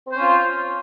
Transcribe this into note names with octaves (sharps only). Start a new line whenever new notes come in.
C4 C#4 F4 C5